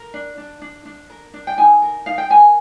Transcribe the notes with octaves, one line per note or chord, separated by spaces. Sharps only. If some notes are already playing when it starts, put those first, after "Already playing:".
Already playing: A#4
D4
D4
D4
D4
A#4
D4
G5
D#4 G#5
A#4
D#4 F5
G5
A#4 G#5